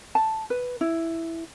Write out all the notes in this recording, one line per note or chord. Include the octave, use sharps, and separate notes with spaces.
A5
B4
E4